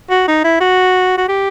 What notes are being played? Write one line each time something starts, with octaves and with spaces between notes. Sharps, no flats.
F#4
D#4
E4
F#4
F#4
G4